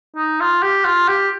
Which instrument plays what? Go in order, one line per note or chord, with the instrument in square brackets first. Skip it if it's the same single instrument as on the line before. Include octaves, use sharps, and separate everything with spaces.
[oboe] D#4
F4
G4
F4
G4